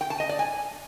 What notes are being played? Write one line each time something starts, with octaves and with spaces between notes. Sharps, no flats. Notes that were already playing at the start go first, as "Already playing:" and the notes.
G5
A5
D#5
D5
G#5